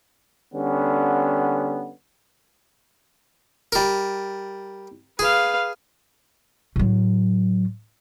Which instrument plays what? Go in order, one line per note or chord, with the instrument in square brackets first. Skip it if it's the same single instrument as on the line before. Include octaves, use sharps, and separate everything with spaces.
[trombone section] D3 G3 B3 C#4
[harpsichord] G3 A#4
[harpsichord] G#4 [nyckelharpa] B4 F5
[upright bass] A2 F#3